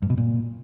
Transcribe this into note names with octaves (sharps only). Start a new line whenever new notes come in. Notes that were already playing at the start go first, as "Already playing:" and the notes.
G2
B2
A#2